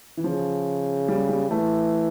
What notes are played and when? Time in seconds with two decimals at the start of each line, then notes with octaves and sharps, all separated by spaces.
0.17 E3
0.23 C#3 F3
1.08 G3
1.29 G3
1.50 E3 A3